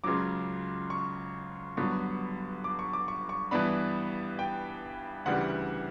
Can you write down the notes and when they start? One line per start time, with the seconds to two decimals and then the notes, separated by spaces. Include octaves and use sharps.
0.04 C#2 C#3 F#3 D6
0.90 C#6
1.77 G2 D3 F#3 B3 C#6
2.64 D6
2.79 C#6
2.93 D6
3.08 C#6
3.29 C#6
3.51 G2 E3 B3 D4 B5
4.39 G5
5.25 D2 C#3 E3 G3 D4 F#5